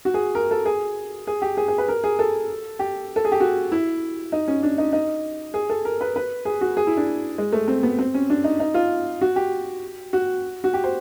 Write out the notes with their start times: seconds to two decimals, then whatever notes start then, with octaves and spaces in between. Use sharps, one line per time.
0.05 F#4
0.14 G#4
0.35 A#4
0.51 A4
0.66 G#4
1.27 G#4
1.42 G4
1.57 G#4
1.68 G#4
1.78 B4
1.88 A#4
2.04 G#4
2.19 A4
2.79 G4
3.16 A4
3.25 G#4
3.32 G4
3.40 F#4
3.72 E4
4.32 D#4
4.48 C#4
4.63 D4
4.78 D#4
4.93 D#4
5.54 G#4
5.69 A4
5.85 A#4
6.01 B4
6.16 B4
6.45 G#4
6.61 F#4
6.77 G#4
6.87 E4
6.97 D4
7.38 G#3
7.53 A3
7.68 C4
7.83 B3
7.99 C4
8.14 C#4
8.30 D4
8.44 D#4
8.60 D#4
8.74 F4
9.21 F#4
9.36 G4
10.13 F#4
10.64 F#4
10.74 G4
10.84 C5